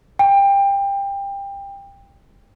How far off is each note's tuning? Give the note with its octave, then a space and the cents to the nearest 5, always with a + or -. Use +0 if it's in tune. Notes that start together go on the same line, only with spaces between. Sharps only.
G5 +25